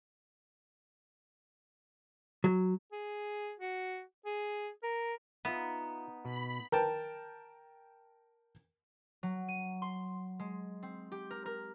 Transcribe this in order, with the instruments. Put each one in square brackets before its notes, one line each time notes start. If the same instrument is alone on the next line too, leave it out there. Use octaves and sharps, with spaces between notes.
[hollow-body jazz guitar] F#3
[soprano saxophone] G#4
F#4
G#4
A#4
[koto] B3 [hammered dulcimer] D#4 F#5 [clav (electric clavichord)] F4 E5
[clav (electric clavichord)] B2 [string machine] B5
[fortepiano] A#4 G5 A5
[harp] F#3
D#7
C6
G#3
C4
G4
A#4
A#4